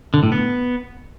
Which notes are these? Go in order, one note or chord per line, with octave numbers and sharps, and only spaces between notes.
D3
A2
B3